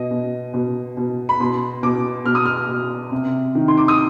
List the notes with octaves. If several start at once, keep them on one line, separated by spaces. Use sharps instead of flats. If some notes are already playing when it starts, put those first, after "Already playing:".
Already playing: B2 D#5
B2
B2
B2
B5
B2 C6
B2 D6
B2 F6
D#6
F6
B2
C3
D#3
C6
D6
D#6